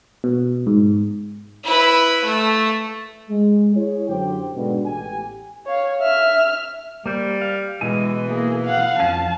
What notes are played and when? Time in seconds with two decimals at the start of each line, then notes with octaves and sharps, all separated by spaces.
0.24 B2
0.67 G#2
1.64 E4 B4
2.24 A3
3.30 G#3
3.76 E4 G#4 C#5
4.09 F#2 D3 F#3 G4 C5 G5
4.56 G#2 B2 D3
4.85 A1 G4 G#5
5.66 C#5 F5
6.01 E5 F6
7.06 G3 A#3 C5
7.42 F5
7.81 B2 E3 G#3 E4 G#5
8.28 A#3 G#4
8.64 F5 F#5
9.00 F2 C#4 A5